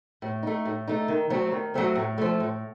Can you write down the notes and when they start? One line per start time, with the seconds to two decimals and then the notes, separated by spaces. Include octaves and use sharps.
0.22 A2
0.43 A3 D#4
0.65 A2
0.88 A3 D#4
1.08 D#3
1.30 F#3 A3 C4
1.52 D#3
1.74 F#3 A3 C4
1.95 A2
2.18 F3 A3
2.40 A2